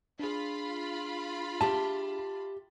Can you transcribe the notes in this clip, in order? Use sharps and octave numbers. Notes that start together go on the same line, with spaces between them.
D4 F4 G#4 B5
G4 E5 A5